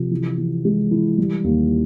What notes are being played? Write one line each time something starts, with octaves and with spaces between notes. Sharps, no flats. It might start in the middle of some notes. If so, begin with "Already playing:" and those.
Already playing: C3 F3
E3
E3
G#3
E3
G3
D#2